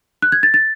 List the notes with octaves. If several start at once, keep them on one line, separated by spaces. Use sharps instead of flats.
F#6
G#6
A6
A6